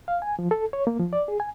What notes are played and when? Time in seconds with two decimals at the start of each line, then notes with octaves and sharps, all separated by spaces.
0.08 F5
0.22 G#5
0.39 F3
0.51 A4
0.73 C#5
0.87 A#3
0.99 F3
1.13 D5
1.28 G#4
1.40 G#5